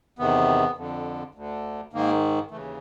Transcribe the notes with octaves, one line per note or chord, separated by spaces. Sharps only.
E2 C3 D#3 B3
F2 D3
D2 D3
G#2 D#3 A#3
D#2 C#3 E3 A3